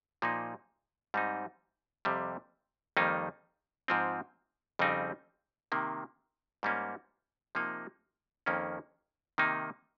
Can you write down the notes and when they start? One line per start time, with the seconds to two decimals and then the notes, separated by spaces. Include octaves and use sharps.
0.22 A#2 F3 A#3 D#4
1.14 G#2 G3 C4 D#4
2.05 F2 C3 G3
2.97 F2 D#3 G3 A#3 D#4
3.88 G#2 F3 C4
4.79 F2 C#3 G3 C4 D#4
5.72 C3 D#3 A#3
6.63 G#2 G3 A#3 C#4
7.55 C3 F3 A#3 D#4
8.46 F2 D#3 A#3 C#4
9.38 C3 D#3 A#3 D#4